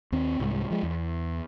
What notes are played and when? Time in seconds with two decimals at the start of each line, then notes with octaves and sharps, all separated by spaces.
0.12 D#2 C4
0.40 C2 G#2
0.71 F3 G#3
0.83 E2